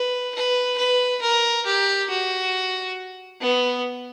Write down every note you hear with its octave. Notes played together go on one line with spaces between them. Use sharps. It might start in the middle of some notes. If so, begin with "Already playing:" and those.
Already playing: B4
B4
B4
A#4
G4
F#4
B3